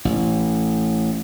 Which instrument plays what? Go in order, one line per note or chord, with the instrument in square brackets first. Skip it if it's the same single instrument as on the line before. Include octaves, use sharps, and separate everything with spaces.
[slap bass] A1